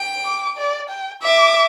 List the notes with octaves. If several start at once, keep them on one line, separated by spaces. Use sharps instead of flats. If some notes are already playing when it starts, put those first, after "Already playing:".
Already playing: G5
D6
D5
G5
E5 D6